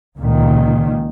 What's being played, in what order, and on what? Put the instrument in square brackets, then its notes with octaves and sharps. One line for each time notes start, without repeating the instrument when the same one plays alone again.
[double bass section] C#2 A#2 D#3